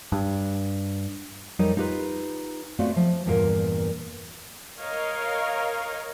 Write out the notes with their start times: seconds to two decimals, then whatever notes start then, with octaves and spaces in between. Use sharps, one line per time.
0.12 G2
1.59 F2 G3 D#4 A#4 C#5 D#5
1.77 D#4 F4 G4 B4
2.79 A3 B3 C4 F4 F#4 D5
2.96 F3
3.26 E2 G2 A#2 A#3 F4 A#4
4.80 A#4 C#5 D#5 F5